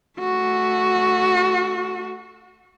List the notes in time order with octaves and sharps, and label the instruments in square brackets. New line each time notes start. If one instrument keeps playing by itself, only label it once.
[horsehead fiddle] A3 F#4